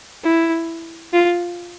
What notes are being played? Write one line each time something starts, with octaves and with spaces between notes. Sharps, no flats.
E4
F4